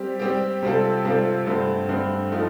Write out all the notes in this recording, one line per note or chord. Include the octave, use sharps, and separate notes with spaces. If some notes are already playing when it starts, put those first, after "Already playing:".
Already playing: G3 C4 G4
G3 C4 G4
C3 G3 C4 F4 A4
C3 G3 C4 F4 A4
G2 D3 A3 C4
G2 D3 A3 C4
F3 A3 D#4